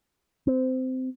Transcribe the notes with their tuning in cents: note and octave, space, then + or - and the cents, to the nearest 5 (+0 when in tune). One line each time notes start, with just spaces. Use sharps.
C4 -20